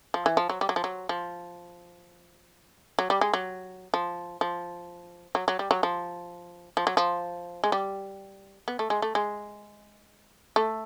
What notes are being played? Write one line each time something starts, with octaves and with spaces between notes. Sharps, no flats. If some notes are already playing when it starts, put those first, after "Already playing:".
F3
E3
F3
F#3
G3
F#3
F3
F#3
F3
F#3
G3
G#3
F#3
F3
F3
F#3
F#3
G3
F#3
F3
F3
F#3
F3
G#3
G3
B3
A3
G#3
A3
G#3
A3